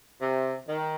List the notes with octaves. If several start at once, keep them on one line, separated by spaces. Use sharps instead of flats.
C3
D#3